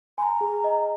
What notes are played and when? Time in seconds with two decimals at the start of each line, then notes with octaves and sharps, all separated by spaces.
0.18 G#5 C6
0.22 A#5
0.41 G#4
0.64 D#5